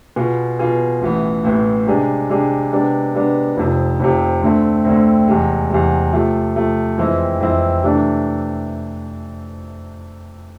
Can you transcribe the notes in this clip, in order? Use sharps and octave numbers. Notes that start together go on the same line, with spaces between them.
B2 B3 F4 G#4
B2 B3 F4 G#4
A1 A2 E3 B3
A1 A2 E3 B3
C3 G#3 D4 G#4
C3 G#3 D4 G#4
C3 G#3 B3 D4
C3 G#3 B3 D4
F1 F2 C3
F1 F2 C3
D2 D3 A3 C4
D2 D3 A3 C4
E2 C3 G#3
E2 C3 G#3
C3 F3 A3
C3 F3 A3
F2 E3 G#3 C4 E4
F2 E3 G#3 C4 E4
C3 E3 A3 D4